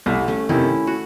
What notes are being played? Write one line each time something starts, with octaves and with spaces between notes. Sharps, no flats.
C2 A3
A3 C#4
C3 D#3 C#4 E4
F#4